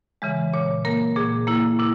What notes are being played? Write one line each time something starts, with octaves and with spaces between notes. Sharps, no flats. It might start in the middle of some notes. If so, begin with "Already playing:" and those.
C#3 E3 G#3
A#2 C#5
A#3 A#4
A#2 G#4
A#3 E4
A#2 E4